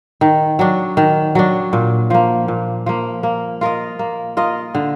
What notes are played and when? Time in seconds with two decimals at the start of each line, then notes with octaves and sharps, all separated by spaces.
0.21 D#3
0.59 F#3 D4
0.97 D#3
1.35 F#3 D4
1.73 A#2
2.10 F3 A#3
2.48 A#2
2.86 F3 A#3
3.23 A#3
3.61 F4 A#4 D#5
3.99 A#3
4.37 F4 A#4 D#5
4.75 D3